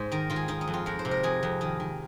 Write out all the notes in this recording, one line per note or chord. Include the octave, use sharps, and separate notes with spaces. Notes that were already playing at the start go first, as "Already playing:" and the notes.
Already playing: G#2 C5
D#3 A#4
D#3 F4
G#4
D#3 D#4
D#4
F2
F4
F2 A#4
C5
C3
A#4
F2 G#4
F2
D#3 D#4
D#3